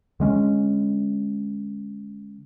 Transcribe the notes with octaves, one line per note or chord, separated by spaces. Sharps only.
D3 G#3 C#4